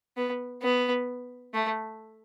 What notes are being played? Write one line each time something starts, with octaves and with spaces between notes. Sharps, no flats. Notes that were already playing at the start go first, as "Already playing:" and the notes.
B3
B3
A3